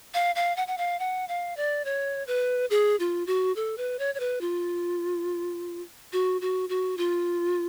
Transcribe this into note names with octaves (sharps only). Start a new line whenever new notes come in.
F5
F5
F#5
F#5
F5
F#5
F5
D5
C#5
B4
G#4
F4
F#4
A4
B4
C#5
C#5
B4
F4
F#4
F#4
F#4
F4